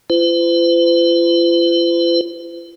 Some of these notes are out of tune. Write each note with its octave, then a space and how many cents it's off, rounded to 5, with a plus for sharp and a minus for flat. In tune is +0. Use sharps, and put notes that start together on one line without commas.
F4 -40 C5 -45